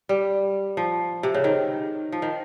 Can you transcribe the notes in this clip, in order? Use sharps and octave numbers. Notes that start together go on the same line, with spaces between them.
G3
F3
C3
C#3
D#3
F3
D#3